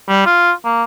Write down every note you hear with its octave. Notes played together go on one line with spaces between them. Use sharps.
G3
F4
A#3